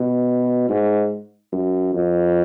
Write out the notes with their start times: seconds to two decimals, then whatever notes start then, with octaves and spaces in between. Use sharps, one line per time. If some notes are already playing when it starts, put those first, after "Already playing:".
Already playing: B2
0.69 G#2
1.52 F#2
1.94 F2